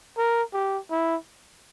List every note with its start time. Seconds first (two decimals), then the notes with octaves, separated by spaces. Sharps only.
0.17 A#4
0.53 G4
0.91 E4